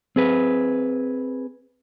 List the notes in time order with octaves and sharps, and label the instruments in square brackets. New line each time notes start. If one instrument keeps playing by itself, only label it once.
[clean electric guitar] C4 G#4 B4